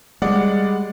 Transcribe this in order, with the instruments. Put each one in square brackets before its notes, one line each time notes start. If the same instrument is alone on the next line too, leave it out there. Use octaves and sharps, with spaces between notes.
[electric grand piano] G3 D5 F#5 [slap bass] G#3